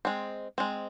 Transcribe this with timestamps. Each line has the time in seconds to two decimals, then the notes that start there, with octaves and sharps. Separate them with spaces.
0.05 G#3 C4
0.58 G#3 C4